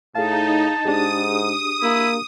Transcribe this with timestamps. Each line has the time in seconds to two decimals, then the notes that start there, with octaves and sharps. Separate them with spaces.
0.15 A2 D#4 G#4 F5 A5
0.85 G#2 D4 G4 G#4 D#6
1.82 A#3 E4